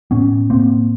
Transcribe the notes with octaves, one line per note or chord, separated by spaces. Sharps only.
A2 B3 C#4
A2 A#3 C4